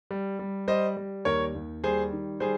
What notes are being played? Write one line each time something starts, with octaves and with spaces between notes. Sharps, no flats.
G3
G3
G3 C5 D#5
G3
D#2 A#4 C#5
D#2
G3 G#4 C5
D#3
G3 G#4 C5